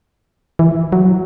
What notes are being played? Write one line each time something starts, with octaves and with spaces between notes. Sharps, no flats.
E3
F#3